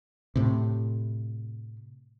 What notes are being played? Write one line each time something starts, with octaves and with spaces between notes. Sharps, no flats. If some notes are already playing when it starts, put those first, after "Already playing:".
A2 C3